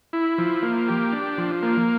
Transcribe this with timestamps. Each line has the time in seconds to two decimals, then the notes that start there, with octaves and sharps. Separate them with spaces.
0.13 E4
0.38 F3
0.62 A#3
0.88 G4
1.13 D4
1.38 F3
1.63 A#3